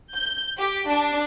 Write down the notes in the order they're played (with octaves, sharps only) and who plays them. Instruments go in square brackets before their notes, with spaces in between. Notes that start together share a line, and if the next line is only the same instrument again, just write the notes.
[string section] G6
G4
D4